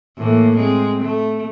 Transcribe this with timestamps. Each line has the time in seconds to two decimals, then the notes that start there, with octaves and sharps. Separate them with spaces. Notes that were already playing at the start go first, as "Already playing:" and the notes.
0.18 A2 E3 A#3
0.55 G#3 C4
1.01 A3